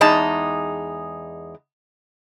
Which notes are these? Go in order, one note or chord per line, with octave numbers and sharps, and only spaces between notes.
E2 G#3 D#4 A5